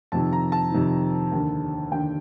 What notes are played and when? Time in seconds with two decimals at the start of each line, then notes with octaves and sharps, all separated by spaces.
0.12 F2 C3 D#3 A5
0.33 A#5
0.52 A5
0.72 F2 C3 D#3
1.32 D#2 D3
1.92 D#2 D3 G5